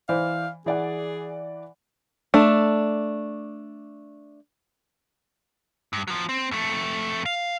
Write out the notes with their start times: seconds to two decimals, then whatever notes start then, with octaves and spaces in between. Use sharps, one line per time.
0.09 E3 C5 D5 F5
0.66 E3 G#4 D5 F#5
2.34 A3 D4
5.93 G2
6.08 F3 F#3
6.29 C4
6.51 F2 A3
7.26 F5